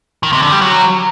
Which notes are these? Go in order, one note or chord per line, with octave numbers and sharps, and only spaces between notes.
D#3
C3
D3
G3
F#3